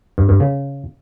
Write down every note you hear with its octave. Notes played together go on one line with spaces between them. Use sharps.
G2
G2
C#3